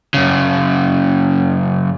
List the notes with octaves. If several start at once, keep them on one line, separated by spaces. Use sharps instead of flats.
F#2 C#3